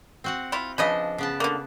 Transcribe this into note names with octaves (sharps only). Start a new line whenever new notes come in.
C4 F#4 F#5
E4 F4
C#3 F3 D4 B4 D#5
C#3 B3 A5
D3 A#3